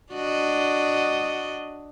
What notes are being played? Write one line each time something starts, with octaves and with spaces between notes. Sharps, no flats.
D4 F#4 D#5